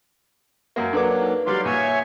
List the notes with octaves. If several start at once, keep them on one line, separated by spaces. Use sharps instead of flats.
F#2 A#3 E5 F#5
F#3 A#3 D4 A4 B4 C#5 D6
D#4 B4
F#3 G3 D5 F5 C6
A#1 C#5 E5 G#5